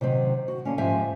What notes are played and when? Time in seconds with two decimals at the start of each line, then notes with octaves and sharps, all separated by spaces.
0.01 C3 D#3 F#3 C4
0.48 F#4
0.65 D3 A#3 C#4
0.78 G#2 F3 G4 E5 G#5